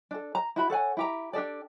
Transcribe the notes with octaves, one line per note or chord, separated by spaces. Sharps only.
D4 A4
A#5
E4 F#4 B5
A4 C#5 F#5 G#5
E4 G4 A#5
D4 G4 A4 D5